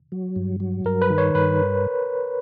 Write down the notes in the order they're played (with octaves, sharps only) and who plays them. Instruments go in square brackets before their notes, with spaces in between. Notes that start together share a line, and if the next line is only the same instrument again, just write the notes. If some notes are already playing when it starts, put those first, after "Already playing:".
[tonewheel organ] F#3
G2
F#3
[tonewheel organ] G2 [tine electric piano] A#4
[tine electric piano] B4
[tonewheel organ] D#3
[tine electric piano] C#5
[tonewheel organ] G2 [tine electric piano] B4